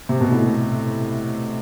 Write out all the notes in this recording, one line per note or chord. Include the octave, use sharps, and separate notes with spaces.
C3
B2
A2
B2